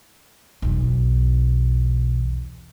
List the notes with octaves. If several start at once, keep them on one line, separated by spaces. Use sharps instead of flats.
B1 E2